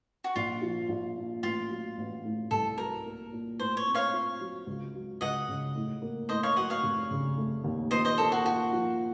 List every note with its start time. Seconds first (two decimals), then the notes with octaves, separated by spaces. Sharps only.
0.24 F#4
0.36 A#1 F4
0.62 F3
0.89 A#1
1.16 A#2
1.43 A1 F4
1.70 F#3
1.98 A1
2.25 A2
2.51 C2 A4
2.78 F#3 A#4
3.06 A#3
3.32 A#2
3.59 A2 C5
3.77 C#5
3.87 C4
3.95 C#5 F5
4.13 F4
4.40 F#3
4.67 C#2
4.94 F#3
5.21 C#2 D#5 F#5
5.49 C#3
5.75 A2
6.02 A#3
6.29 A2 C5 D#5
6.43 C#5 F5
6.56 F#3 D#5 F#5
6.70 C#5 F5
6.83 F1
7.10 C#3
7.37 A3
7.64 D#2
7.91 A#2 C5 D#5
8.05 C5 D#5
8.18 A#3 A4
8.32 F#4
8.45 F4 F#4
8.72 F3